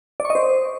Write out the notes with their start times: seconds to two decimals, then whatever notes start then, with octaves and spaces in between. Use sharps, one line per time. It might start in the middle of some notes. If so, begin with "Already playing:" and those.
0.20 D5
0.25 C#6
0.30 D#5
0.35 C5